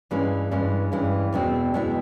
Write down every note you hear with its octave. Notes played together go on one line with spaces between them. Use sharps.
G2 E3 G#3 C#4
G2 E3 G#3 C#4
G2 E3 G#3 C#4
E2 B2 G#3 C4 E4
E2 B2 G#3 C4 E4